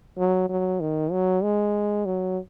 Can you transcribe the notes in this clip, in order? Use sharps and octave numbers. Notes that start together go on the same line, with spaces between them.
F#3
F#3
D#3
F#3
G#3
F#3